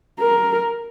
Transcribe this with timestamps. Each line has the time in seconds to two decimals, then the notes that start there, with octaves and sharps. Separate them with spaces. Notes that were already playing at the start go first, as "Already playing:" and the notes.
0.19 A#4